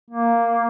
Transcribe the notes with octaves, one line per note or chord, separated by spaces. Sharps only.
A#3